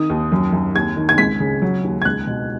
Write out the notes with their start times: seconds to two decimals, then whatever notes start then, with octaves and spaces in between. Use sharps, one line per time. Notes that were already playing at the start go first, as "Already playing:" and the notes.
Already playing: D#3 D#6
0.10 D#2
0.32 F#2
0.53 F#2
0.75 D#2 G#6
0.96 D#3
1.09 G#6
1.18 C#2 B6
1.40 C#3
1.62 F#3
1.84 D#2
2.02 G#6
2.05 C#2 F#6
2.27 B2